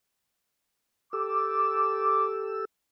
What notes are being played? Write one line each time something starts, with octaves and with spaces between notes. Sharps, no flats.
G4 A4 D6 E6